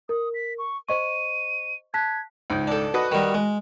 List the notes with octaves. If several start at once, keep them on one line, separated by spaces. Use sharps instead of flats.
A#4 D#6
B6
C#6
C5 D#5 C#6 D#7
A5 F#6 G#6 B6
C#2 G#2
D4 A4
F#4 B4 D#5
D#3 G3
G#3